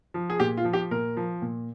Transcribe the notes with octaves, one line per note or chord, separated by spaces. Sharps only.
F3
G#4
A#2 G4
F4
F3
G4
A#2 A#4
F3
A#2